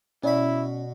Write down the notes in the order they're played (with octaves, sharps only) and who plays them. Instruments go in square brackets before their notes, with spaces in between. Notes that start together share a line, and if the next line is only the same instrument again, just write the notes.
[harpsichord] B2 B5 [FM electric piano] C#4 [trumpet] E4 [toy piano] D5